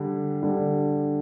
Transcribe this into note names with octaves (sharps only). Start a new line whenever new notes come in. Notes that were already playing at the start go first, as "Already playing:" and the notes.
Already playing: D3 G3 D4
D3 G3 D4